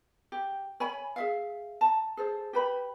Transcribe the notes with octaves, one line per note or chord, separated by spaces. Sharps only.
G4
C#5 G#5 B5
G#4 E5 F5
A5 A#5
G#4 A4 C5
G4 B4 B5